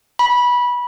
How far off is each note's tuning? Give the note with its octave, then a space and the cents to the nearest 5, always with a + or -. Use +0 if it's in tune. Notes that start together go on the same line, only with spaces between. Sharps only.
B5 -20